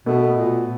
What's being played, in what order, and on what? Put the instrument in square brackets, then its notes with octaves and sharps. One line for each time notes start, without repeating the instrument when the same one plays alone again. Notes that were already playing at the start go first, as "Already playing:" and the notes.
[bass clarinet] B2 [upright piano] A3 B3
[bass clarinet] A#2